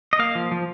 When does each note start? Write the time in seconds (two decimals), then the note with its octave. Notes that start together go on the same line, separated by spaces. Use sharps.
0.13 D#5
0.19 A#3 F5
0.35 F3
0.51 F3